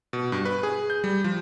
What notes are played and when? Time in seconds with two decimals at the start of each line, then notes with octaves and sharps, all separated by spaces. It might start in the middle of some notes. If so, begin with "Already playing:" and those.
0.13 B2
0.32 G2
0.45 B4
0.63 G#4
0.90 G6
1.04 G3
1.24 F3